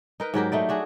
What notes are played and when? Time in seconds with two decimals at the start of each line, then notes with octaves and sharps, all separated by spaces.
0.20 D#4 A#4 B4
0.34 G#2 F#3 G4 A#4
0.52 A3 D#4 D5
0.69 D4 F#4 G#4